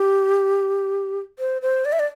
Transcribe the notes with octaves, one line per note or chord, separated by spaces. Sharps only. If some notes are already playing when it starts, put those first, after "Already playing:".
Already playing: G4
C5
C5
D5
E5
D5